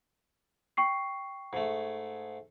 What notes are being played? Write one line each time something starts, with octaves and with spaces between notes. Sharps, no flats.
G5 C#6 C7
G#2 A3